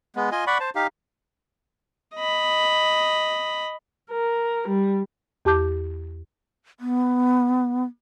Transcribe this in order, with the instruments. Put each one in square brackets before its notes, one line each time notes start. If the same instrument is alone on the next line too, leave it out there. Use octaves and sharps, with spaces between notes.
[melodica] G#3 B3
F4 D#5 G#5
D5 F#5 B5 C#6
C5 A5
D#4 G4 F5
[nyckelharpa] D#5 B5
[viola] A#4
G3
[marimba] E2 G4 A5 D6 G6
[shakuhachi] B3